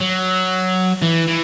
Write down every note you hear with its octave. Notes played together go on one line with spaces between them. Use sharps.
F#3
E3
E3